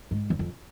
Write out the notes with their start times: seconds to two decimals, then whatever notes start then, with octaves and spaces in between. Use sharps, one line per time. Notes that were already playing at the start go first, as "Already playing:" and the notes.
0.11 G#2
0.30 E2
0.39 F2